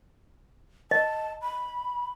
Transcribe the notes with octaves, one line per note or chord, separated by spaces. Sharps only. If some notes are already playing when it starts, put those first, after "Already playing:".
D#5 A5
B5